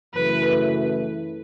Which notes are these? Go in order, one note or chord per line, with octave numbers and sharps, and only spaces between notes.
F#2 C#3 E3 A3 B4